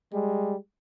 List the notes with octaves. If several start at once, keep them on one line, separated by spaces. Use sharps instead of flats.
G3 G#3